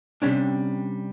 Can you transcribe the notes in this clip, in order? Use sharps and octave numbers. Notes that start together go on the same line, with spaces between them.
C3 F3 G3 C#4 D4